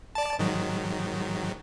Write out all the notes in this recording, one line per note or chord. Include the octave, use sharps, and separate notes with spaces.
D5 A5
G#2 D#3 F#3